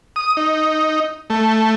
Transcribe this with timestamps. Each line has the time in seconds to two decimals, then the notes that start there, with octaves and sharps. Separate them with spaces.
0.16 D#6
0.37 D#4
1.30 A3